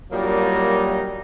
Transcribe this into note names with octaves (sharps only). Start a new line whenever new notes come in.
A#2 F#3 G3 A#3 D4 D#4